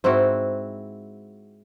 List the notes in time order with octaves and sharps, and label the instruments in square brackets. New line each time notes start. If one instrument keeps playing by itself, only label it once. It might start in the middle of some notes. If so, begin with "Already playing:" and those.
[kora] G#2 C4 E4 F#4